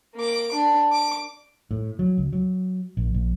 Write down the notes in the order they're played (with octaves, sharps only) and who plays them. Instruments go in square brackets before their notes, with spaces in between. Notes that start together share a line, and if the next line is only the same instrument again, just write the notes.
[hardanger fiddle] A#3 D6
D4
D6
[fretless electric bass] A2
F#3
C#2
F#3
A#1
A#1